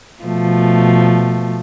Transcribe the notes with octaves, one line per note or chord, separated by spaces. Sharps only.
B2 F3 A3